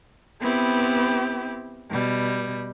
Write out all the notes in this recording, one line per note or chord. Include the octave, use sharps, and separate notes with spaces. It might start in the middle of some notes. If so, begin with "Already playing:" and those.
B3 C4 E4 G4
B2 G3